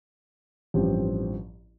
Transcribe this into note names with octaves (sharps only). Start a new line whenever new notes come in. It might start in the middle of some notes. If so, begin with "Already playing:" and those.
A1 G2 F3 C4 G4